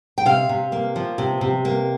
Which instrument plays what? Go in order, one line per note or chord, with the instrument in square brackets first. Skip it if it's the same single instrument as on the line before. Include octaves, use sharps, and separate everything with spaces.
[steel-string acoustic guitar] G5
C3 F5
C3
A#3
F3
C3
C3
A#3